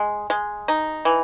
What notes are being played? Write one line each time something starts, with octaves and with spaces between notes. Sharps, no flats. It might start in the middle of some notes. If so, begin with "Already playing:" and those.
Already playing: G#3
G#3
D#4
E3